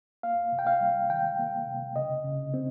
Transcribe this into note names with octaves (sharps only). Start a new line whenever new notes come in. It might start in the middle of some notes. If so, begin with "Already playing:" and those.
A#3 F5
C3
G5
F5
G3
D#3 G5
A#3
C3
C#3 D#5
C#3
C4